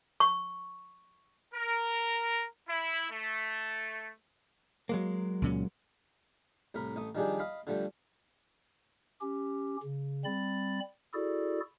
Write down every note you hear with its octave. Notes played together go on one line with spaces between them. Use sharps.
C#6
A#4
E4
A3
F#3 G#3 A#3
C#2 A#2 C#4
C2 A2 A#4 B5
A1 A3 D#6
D#3 F3 G3 D4 G4 G#4
D#5 F5 B5
D3 F3 G3 A3
C#4 G4
C#3
G3 C4 B5 A6
E4 F#4 G#4 A4 D5